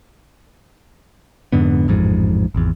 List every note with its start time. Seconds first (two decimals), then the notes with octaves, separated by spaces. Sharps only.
1.52 F2 G#2 D3 B3
1.88 A1 F2 G#2
2.55 G#1 E2